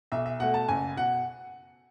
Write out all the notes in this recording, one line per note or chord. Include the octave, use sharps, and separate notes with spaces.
B1 E5
E5
B2 A3 F#5
A5
F#1 G#5
B2 F#5